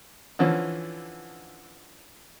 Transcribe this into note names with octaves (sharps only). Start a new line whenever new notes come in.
D3 E3 F3 C#4